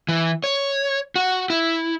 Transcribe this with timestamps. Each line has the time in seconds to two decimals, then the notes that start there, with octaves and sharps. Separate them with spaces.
0.08 E3
0.44 C#5
1.16 F#4
1.50 E4